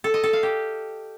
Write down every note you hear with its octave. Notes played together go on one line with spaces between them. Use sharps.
A4
D#5
A4
F5
G4